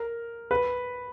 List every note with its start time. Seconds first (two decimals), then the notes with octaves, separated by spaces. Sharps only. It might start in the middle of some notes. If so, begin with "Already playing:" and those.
Already playing: A#4
0.51 B4